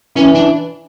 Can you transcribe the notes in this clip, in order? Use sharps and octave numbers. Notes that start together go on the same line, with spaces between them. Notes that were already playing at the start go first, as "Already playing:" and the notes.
E3 C#4
D4